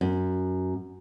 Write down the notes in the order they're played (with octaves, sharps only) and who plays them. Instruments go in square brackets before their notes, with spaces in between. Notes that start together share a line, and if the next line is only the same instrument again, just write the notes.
[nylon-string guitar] F#2